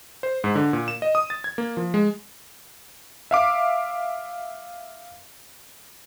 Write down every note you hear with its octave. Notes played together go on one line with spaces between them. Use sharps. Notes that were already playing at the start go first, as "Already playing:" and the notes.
C5
G#2
D3
A#2
E7
D#5
D#6
A6
G#6
A#3
F3
G#3
E5 F5 D6